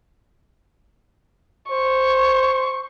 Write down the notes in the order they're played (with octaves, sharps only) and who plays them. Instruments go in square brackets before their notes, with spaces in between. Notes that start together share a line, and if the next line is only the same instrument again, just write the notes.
[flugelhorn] C5 [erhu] C#6